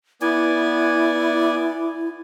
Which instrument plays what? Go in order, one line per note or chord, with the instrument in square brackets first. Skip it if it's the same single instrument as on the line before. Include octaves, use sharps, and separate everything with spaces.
[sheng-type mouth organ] B3 D5 G#5 [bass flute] E4